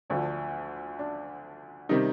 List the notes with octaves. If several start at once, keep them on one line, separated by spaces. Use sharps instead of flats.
D2 D3 F3 D4
D4
C3 D#3 G3 D#4